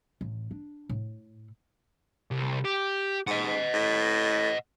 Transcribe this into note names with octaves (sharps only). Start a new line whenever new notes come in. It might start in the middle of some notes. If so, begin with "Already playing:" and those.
A1
D4
A2
C2
G4
G#2 D#5 F#5
A2